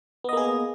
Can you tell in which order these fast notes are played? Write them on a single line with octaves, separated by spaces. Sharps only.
B3 D#5 A#3 G#4